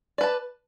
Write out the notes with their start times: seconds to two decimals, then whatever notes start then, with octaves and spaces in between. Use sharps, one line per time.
0.18 D5
0.21 B4
0.23 A5